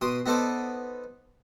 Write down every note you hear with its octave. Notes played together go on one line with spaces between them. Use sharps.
B2 C6 D#6
B3 D#4 A4 C5 D5